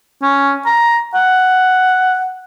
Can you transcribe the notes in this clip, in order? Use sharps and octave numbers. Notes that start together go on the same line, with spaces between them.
C#4
A#5
F#5